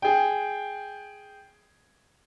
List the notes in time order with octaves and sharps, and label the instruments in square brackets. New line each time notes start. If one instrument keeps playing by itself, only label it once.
[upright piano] G#4 G5